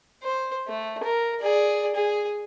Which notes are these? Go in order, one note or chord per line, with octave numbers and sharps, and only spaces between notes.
C5
A3
A#4
G#4 D5
G#4